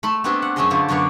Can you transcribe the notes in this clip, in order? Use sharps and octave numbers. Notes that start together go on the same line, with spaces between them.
A3 A5 B5 C6
A3 B3 C4 D4 G4 G#5
F#5
F#2 A3 C#4 G#4 D#5 C6
D3 F4 G4
F#2 D3 B3 D4 C#5 D5